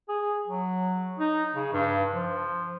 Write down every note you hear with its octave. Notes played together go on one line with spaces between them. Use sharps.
G#4
F#3
D#4
C#3
G2
F3